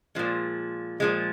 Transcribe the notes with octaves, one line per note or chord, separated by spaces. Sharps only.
A#2 F3 G#3
A#2 F3 G#3